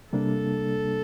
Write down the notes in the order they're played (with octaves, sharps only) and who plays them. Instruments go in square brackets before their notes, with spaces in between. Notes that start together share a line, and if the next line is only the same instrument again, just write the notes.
[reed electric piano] C3 G3 A#3 D4 [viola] A4